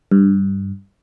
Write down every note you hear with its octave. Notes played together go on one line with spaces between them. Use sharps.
G2